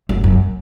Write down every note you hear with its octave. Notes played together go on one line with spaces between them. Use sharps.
F#2
F#2